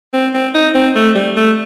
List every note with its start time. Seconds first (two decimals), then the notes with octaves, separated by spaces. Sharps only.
0.14 C4
0.34 C4
0.54 D#4
0.75 C4
0.96 A3
1.15 G3
1.36 A3